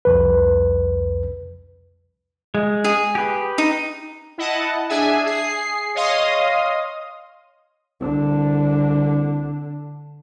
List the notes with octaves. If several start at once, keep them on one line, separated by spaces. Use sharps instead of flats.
C2 F2 B4
G#3
G#4
G4 B4
D#4
E4 D#5 F#5 A5
D4 G#4 E5 G#5
G#4 C7
C#5 D#5 F5 C6 D#6
C2 D3 D4